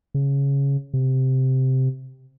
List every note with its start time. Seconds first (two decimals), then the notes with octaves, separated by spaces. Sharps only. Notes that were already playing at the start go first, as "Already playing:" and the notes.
0.14 C#3
0.93 C3